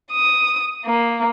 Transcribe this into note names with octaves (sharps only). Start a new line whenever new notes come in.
D#6
A#3